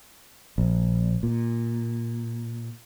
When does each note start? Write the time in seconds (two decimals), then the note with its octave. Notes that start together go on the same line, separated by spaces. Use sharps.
0.58 A#1
1.23 A#2